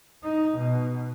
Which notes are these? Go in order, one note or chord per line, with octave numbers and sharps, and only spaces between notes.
D#4
B2